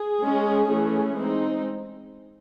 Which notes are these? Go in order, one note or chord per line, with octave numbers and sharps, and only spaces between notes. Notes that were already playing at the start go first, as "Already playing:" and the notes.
Already playing: G#4
G#3 C#4
E3 A3 C#4
G#3 C4 D#4